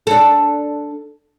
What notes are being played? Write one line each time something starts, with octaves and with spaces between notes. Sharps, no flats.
D4 A4